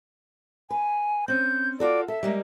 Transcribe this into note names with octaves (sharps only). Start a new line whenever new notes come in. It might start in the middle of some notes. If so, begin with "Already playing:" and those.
B4 G#5
C4 C#4 G6
F4 F#4 A4 D5
A4 E5
G3 G#3 A#3